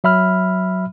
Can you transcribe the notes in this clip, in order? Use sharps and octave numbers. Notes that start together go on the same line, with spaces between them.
F#3 E5 B5 F6